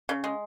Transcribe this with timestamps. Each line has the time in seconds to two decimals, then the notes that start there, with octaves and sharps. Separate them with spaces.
0.09 C#3
0.24 G#3